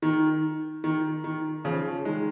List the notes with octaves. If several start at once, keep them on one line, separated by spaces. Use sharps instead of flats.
D#3
D#3
D#3
C#3 F3
D#3 G#3